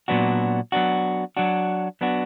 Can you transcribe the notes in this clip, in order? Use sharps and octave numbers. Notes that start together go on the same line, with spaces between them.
A#2 F#3 B3 D4 F#4
F#3 B3 D4 F#4
F#3 D4 F#4
F#3 B3 D4 F#4